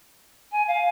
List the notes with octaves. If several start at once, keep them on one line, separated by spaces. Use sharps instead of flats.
G#5
F5